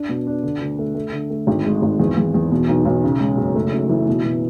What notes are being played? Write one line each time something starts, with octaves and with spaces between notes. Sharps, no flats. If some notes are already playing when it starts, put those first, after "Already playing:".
Already playing: D4
B2
D4
D3
D2
A3
A3
D3
A3
G#1
G#3
G#1
E2
E2
E2
B2
B1
B1
C#3
G#3
F#1
A3
F#2
E3
B2
B2